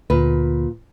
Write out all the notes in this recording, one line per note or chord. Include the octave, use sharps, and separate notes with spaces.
D2 A#2 B4